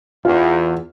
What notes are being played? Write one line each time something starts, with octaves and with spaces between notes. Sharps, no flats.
E2 F4